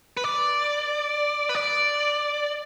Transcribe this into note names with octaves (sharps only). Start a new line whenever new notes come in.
B4
D5
B4
D5